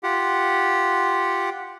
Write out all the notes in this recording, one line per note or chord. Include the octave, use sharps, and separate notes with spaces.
F4 G4 F#5